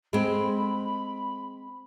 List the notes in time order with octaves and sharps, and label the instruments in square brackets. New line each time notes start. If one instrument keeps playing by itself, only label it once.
[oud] G#3 C4 [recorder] B5